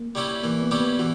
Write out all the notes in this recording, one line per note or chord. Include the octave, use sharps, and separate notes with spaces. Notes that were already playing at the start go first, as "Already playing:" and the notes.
Already playing: A#3
G3 C#4 E4 G4
E3 A#3
B3
G3 C#4 E4 G4
B3
E3 F#4